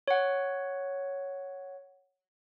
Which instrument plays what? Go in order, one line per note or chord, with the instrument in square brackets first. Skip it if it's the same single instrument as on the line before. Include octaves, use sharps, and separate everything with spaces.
[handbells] C#5 F#5